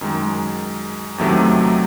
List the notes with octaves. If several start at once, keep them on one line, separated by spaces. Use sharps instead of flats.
F#2 D#3 G#3
E2 C3 D#3 F#3 A3